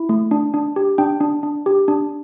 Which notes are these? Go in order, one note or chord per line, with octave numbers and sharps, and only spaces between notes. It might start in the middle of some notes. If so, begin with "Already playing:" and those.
Already playing: E4
A3
D4
D4
G4
D4 G5
D4
D4
G4
D4